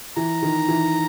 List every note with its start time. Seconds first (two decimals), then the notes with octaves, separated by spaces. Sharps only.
0.16 E3 A#5
0.42 D#3
0.68 E3